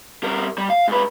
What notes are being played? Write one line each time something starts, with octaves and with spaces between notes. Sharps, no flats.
G3 A#4
G3
F5
G#2 B4